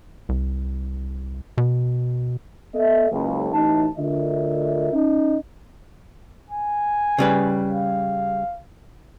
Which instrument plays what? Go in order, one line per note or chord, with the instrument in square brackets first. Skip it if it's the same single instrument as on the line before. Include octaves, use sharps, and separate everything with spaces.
[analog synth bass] C2
B2
[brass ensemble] B3 A4 D#5 E5
F#1 C#2
A1 D#4 A5
D2 D3 F4 A#4 D#5 E5
C#4 D#4
[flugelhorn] G#5
[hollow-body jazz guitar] C#3 G3 B4
[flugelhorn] F5